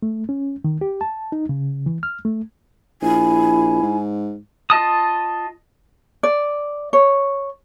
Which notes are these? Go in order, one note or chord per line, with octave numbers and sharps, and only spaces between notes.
A3
C#4
D#3
G4
A5
D#4
C#3
E3
F6
A3
A#1 E4 G#5
G#2
F4 D#5 A5 D#6
D5
C#5